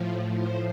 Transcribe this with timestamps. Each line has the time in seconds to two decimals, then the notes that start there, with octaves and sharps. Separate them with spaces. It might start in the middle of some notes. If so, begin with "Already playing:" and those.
Already playing: A2 F3
0.35 C5